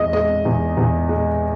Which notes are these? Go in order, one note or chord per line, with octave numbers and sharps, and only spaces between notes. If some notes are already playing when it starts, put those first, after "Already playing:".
Already playing: E2 G#3 D#5 D#6
G#3 D#5
E2
E2
G#3